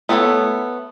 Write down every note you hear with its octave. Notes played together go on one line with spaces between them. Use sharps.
A3 B3 A4 B4 C#5